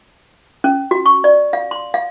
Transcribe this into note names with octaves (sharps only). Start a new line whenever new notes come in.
C#4
F#4
C#6
D5
F5
C6
F5